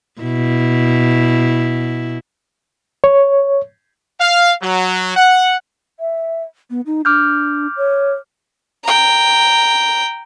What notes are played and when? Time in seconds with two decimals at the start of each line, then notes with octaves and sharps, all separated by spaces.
0.21 B2 E4
3.04 C#5
4.20 F5
4.63 F#3
5.17 F#5
6.00 E5
6.70 B3
6.86 D#4
7.05 D4 D6 F6 G6
7.77 C#5
8.84 G5 A#5